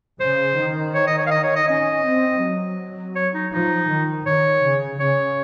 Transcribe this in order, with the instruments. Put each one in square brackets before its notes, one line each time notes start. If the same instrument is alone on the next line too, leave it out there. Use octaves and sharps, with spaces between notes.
[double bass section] C#3 [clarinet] C5
[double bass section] D#3
[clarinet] C#5
D#5
C#5
F5
D#5
C#5
D#5
[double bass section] C#4 [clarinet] D#5
[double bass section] C4
F#3
[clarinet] C#5
D#4
[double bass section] F3 [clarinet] D#4
[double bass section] D#3
[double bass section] D#3 [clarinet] C#5
[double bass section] C#3
[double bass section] C#3 [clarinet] C#5